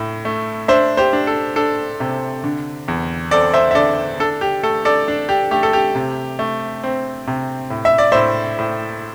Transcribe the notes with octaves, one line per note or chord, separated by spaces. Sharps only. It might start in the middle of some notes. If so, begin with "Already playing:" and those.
Already playing: A2
A3
D4 C5 E5
G4 C5
D4
A4
D4 A4
C3
D3
E2
C4 A4 D5
C5 E5
E5
D3 A4 D5
D4 A4
G4
A3 A4
A4 D5
D4
G4
A3 G4
A4
G4
C3
A3
C4
C3
A2
E5
D5
A2 C5 E5
A2